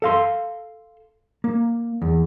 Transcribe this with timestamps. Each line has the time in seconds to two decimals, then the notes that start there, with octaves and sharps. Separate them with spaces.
0.02 A4 F5 C6
1.44 A#3
2.02 E2